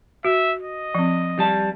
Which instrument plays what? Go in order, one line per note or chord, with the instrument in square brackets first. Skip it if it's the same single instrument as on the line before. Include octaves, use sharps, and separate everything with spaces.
[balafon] F#4 [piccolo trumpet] E5
[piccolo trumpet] D#5
[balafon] F3 C4
[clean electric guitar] G3 A5